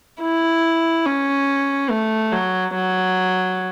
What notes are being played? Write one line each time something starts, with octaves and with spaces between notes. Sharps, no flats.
E4
C#4
A3
F#3
F#3